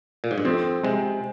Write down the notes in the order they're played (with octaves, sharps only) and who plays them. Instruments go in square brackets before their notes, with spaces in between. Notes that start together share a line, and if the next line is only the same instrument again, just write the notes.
[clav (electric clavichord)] A#2
G#2
G2
[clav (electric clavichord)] F2 [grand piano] C4
[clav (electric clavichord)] C3 [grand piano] G#3